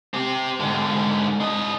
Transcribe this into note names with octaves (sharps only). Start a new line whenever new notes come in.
C4 G4
G#2 D3
D4 D#5